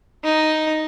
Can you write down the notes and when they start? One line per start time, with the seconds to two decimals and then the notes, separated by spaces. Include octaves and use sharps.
0.24 D#4